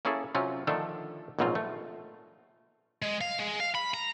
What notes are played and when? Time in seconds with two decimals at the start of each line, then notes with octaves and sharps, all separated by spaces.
0.05 A#3 C#4 E4 G#4 A4
0.35 C3 F#3 C4 C#4 F4
0.67 D3 D#3 F3 A3 D4 A4
1.39 A#1 G#2 B2 F#3 C4 F4
1.55 A3
3.02 G#3
3.21 F5
3.39 G#3
3.60 F5
3.75 B5
3.94 A#5